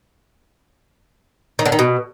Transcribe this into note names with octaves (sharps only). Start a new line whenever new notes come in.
D#3
D3
D#3
B2